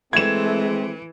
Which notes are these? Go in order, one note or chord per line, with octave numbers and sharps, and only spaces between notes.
E3 G#3 A3 C4 G#6 E7